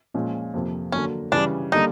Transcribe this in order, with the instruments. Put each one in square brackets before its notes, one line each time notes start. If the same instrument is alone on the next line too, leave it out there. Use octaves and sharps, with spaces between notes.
[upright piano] A#2 F3 G#3 C#4
F2 C3 F3 A#3
[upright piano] D3 F#3 A#3 [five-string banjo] C#4
[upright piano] C#3 E3 G3 [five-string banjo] D4
[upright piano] D3 G3 A#3 [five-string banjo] D#4